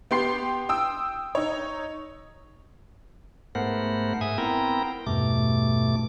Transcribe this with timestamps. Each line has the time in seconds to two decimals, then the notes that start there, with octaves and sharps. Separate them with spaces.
0.11 B3 G4 C6 C7
0.69 G5 D#6 E6
1.35 D#4 C#5
3.55 G#2 A3 B3 A#4 C5 F#5
4.21 G#2 E5 G#5 D#6
4.38 B3 C4 E4 A#4 G5 A#5
5.07 E2 G2 B2 A3 D6